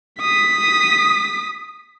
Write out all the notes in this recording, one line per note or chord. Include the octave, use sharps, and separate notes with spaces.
D#6 B6